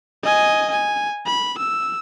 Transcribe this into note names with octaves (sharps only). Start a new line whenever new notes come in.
D#5 G#5
G#5
B5
E6